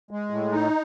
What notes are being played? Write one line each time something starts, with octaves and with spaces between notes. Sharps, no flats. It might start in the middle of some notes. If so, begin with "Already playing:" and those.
G#3
A2
D#4